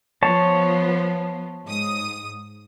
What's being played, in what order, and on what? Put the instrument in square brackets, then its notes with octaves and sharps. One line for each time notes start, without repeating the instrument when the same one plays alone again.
[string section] F3 B3 [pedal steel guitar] C#5 A5
[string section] G#2 D#6